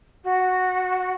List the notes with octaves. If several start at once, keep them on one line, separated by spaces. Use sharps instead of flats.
F#4